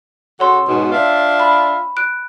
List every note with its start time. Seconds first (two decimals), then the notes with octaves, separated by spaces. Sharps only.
0.40 C#3 F#4 A4 C#5 C6
0.67 G#2 B2
0.92 D4 F4 E5
1.40 B5
1.97 F#6 D7